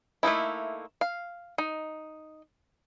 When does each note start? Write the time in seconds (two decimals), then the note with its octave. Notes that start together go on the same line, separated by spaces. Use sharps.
0.23 A3 A#3 D#4 E4
1.01 F5
1.58 D#4